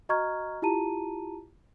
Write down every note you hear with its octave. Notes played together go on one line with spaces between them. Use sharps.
F#4 D#5 A#5 C#6 F6 G#6
E4 F4 G4 A5 A#5 D#7